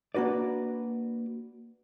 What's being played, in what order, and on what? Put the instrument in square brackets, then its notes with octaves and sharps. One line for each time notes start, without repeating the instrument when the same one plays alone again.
[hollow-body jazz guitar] A#3 D4 F#4 B4 D5